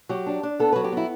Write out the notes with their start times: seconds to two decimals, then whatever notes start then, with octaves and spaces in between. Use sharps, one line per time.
0.09 F#3 G4
0.26 D4
0.43 D4
0.59 B3 A4
0.72 F#3 B4
0.84 G4
0.92 B3 E4